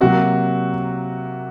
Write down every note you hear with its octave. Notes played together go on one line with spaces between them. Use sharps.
C3 F#3 A#3 F#4